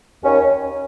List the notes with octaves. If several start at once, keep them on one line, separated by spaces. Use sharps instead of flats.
D#2 C#4